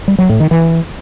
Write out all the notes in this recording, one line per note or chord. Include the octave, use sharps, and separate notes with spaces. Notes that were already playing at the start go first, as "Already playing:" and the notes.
G3
F#3
A2
D#3
E3